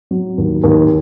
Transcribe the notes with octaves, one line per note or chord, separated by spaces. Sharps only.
F#3
D#2
D#2